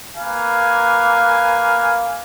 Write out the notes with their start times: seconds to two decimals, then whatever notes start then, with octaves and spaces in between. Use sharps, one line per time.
0.17 A#3 B4 F5 G#5